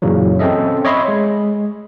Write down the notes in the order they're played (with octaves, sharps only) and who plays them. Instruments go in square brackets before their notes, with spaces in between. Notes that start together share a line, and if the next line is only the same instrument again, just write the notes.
[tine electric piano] F#2 A#2 C#3 E3 F#3
C4 C#4 A4 D#5 E5
C#5 D#5 E5 B5 C6
G#3